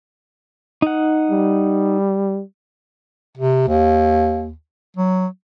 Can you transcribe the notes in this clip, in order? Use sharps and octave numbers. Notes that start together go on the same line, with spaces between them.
D#4 F#5
G3
C3
D#2
F#3